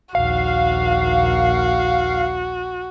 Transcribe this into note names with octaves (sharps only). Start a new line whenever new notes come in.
A#1 D#2 F#4 F5